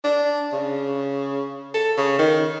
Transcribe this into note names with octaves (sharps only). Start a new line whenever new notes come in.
D4
C#3
A4
C#3
D#3